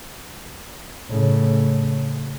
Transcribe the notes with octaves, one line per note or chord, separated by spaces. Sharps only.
A2 C#3